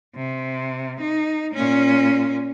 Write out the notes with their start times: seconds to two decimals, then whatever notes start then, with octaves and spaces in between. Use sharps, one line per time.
0.15 C3
1.00 D#4
1.54 A#2 C#4